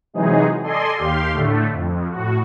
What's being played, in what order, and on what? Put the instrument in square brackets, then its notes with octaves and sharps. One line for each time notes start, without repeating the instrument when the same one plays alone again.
[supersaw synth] C3 E3 F#3 G#3 D#4 G#4
A4 D5 D#5 G#5 C6
D#2 G4 F5 C6
A2 D3 A3
F2
A2 F#4